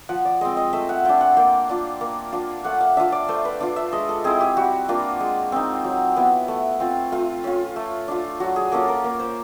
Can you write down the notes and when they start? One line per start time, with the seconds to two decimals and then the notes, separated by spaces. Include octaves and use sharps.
0.09 F3 F#5
0.25 D5
0.41 G#3 C4 D#5
0.57 D#5
0.73 A3 E5
0.89 F#5
1.05 D4 F4 G5
1.21 F#5
1.37 A#3 G5
1.69 D4 F4
2.01 A#3
2.32 D4 F4
2.64 A3 F#5
2.81 F5
2.97 D4 F4 E5
3.12 D5
3.29 A3 C5
3.45 B4
3.60 D4 F4
3.76 E5
3.93 G#3 D#5
4.09 A4
4.24 C4 E4 G#4
4.40 G4
4.57 G3 F#4
4.89 A#3 D4 F4
5.20 G#3
5.52 C4 D#4
5.84 F#3
6.16 B3 E4
6.48 A3
6.80 C4 F4
7.12 A3 F4
7.44 C#4 F4
7.76 A3
8.08 D4 F4
8.40 F#3 F#4
8.56 G#4
8.72 A#3 C#4 F4 A4
8.88 A#4
9.04 A#3
9.20 C5